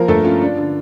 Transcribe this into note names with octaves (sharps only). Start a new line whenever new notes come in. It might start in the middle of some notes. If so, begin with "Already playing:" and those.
Already playing: F3 A#3 A#4
G2 A3 A4
C#4 F4
D4
D3